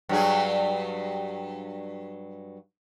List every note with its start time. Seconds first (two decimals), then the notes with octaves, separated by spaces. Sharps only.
0.09 G2 F#3 G#4